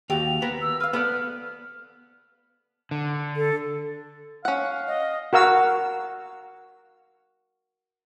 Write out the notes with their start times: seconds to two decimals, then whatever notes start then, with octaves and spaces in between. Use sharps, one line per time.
0.10 D#2 F#4 G4 F7
0.42 B3 A#4
0.62 E6
0.80 B4 F5 F6
0.93 B3 A4 B4 D5 F6
2.91 D3
3.36 A4
4.45 C#4 F5 F#5
4.87 D#5
5.33 F#4 A#4 F5 E6